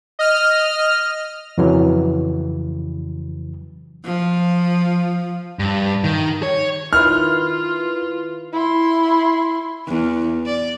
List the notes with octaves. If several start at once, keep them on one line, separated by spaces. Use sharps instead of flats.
D#5 F6
F2 C#3 E3 F#3
F3
G2
D#3
C#5
D#3 E4 F4 B4 F6
E4 C6
E2
D5